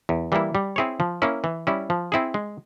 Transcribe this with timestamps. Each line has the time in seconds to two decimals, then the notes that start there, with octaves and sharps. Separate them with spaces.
0.09 E2
0.32 E3 G3 A#3 E4
0.55 G3
0.76 C4 E4 G#4 C#5
1.00 F3
1.22 A#3 C#4 E4
1.44 E3
1.67 G3 C#4 E4
1.90 F3
2.12 C4 E4 G#4
2.34 G#3